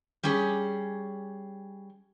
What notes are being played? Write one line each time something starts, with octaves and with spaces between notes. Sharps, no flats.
G3 C#4 G#4